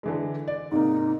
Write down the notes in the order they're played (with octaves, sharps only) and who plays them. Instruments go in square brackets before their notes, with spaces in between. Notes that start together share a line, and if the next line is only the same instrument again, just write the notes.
[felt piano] D3 E3 G#3
D5
[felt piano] G#2 C3 A#3 [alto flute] D#4